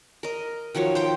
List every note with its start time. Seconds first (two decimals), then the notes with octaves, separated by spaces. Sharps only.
0.23 A#4 D#5
0.75 D#3 F3 F#3 C#5
0.95 C5 G5